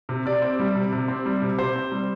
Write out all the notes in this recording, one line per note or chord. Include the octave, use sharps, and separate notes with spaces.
C3
C3 D5
C4
G3
C3
C3
C4
G3
C3
C3 C5
C4
G3